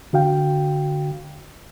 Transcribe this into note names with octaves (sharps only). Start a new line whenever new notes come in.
D3 F#4 F5 G5